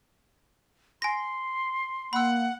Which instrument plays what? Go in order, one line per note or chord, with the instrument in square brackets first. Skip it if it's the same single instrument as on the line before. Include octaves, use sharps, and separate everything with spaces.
[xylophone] G#5 A#6 [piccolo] C6
[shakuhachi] A#3 [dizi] F#5 [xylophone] B5 E6